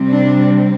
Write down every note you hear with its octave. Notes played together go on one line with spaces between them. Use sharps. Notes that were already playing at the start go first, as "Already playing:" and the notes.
Already playing: C3 G3 C4
D4